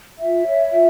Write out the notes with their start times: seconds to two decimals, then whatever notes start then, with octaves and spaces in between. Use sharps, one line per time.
0.18 F4 E5
0.46 C#5
0.73 F4